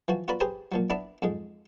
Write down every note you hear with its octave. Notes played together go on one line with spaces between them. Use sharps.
E3 F3 F#4
F4 F#4 B4 D5 A#5 B5
G4 G#4 B4 C5 G#5 A#5
A#2 F3 F#3
B3 D4 E4 B4 D5 E5
F2 G#2 G#3